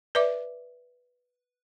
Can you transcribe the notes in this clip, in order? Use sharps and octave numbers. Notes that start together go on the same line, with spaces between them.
B4 D5 E5 D6